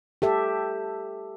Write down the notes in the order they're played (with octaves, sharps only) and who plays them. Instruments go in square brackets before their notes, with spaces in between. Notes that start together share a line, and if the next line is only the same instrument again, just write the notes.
[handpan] G4 A4 E5